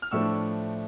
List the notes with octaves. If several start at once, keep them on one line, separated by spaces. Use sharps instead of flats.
F6
A2 F3 A3 D4 C#6 E6